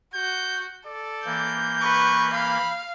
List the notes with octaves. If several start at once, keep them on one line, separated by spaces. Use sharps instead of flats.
F#4 G6
A4 D5
E3 A#3 G6
B4 C#6
F5 B5